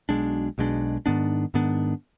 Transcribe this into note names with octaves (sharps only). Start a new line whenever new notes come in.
B1 B2 G#3 D4
B1 B2 G#3 D4
G#2 D#3 B3 D4
G#2 D#3 B3 D4